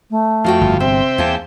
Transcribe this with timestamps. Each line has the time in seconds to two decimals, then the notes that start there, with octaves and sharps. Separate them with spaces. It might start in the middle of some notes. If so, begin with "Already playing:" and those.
0.11 A3
0.44 F2 F3 A#3 F#4 G5
0.61 G1
0.80 C3 C4 C5 E5 G5
1.18 E2 A#3 G#5 A5